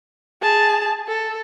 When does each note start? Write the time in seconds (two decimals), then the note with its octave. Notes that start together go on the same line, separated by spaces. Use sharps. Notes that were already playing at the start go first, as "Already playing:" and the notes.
0.42 G#4 A5
1.08 A4